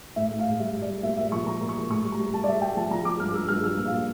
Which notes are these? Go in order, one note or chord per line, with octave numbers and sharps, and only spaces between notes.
A2 E5
A2
F5
A2
G3 E5
A2
D5
G3
A#2 E5
A#2 E5
F3 C#6
F3 A#5
A#2
C#6
F3
A2 C#6
G3
A#5
G3
G3 A5
D5
G3 E5
G3 G5
F3 A5
F3 A#5
F3 D6
G2 F6
G2 E6
G2 F6
F3 E6
A#2
F5
A#2